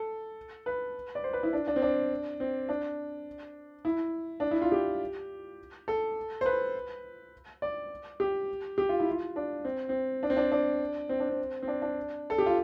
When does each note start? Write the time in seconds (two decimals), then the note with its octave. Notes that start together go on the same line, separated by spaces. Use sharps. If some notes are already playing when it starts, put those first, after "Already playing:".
Already playing: A4
0.66 B4
1.15 D5
1.24 C5
1.33 B4
1.43 E4
1.53 D4
1.67 D4
1.76 C4
1.82 D4
2.40 C4
2.69 D4
3.85 E4
4.40 D4
4.51 E4
4.62 F4
4.72 G4
5.88 A4
6.41 C5
6.46 B4
7.62 D5
8.20 G4
8.78 G4
8.89 F4
9.00 E4
9.11 F4
9.36 D4
9.65 C4
9.89 C4
10.23 D4
10.30 C4
10.37 D4
10.52 D4
11.09 C4
11.20 D4
11.29 C4
11.62 C4
11.68 D4
11.82 D4
12.30 A4
12.38 G4
12.46 F4